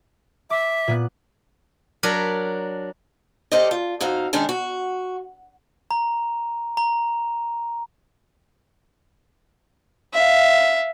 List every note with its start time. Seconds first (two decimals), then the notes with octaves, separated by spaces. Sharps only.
0.50 E5 D6
0.88 A#2 B3 F#6
2.03 F#3 D4 A#4 B5
3.52 G4 A4 A#4 C5 D5 D#5
3.71 F4
4.01 F2 D#4 F#4 F5
4.33 D#3 G#3 C#4 D4 G#4
4.49 F#4
5.91 A#5
6.77 A#5
10.14 E5 F5